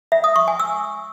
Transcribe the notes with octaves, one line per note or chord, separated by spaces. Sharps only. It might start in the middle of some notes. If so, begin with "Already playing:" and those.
E5
D#6
C#6
G#5
E6